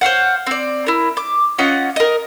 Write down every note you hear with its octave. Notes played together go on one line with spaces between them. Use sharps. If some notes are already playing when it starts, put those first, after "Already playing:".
C5 C#5 F5 F#5
C4 D5
E4 A#4
D6
C#4 F4 D#5 F#5
A#4 D#5